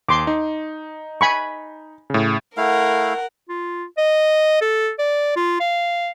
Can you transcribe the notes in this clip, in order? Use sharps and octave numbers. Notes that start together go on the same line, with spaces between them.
D#2 C6 D6
D#4
G#5 B5 C#6
A2 C#3
A3 E4 A#4 F5 F#5
F4
D#5
A4
D5
F4
F5